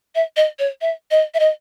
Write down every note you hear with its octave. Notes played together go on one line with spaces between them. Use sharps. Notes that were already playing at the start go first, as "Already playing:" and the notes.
E5
D#5
C#5
E5
D#5
E5
D#5